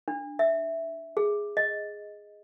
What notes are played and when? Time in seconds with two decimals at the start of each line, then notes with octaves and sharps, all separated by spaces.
0.08 D4
0.39 E5
1.17 G#4
1.57 D#5